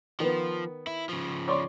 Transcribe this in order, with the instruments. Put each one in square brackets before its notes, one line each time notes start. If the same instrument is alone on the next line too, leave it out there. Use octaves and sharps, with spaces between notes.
[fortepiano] D#3 B3 [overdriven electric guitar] F3
[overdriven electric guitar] E4
C#3 F3
[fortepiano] C#5 D5 C6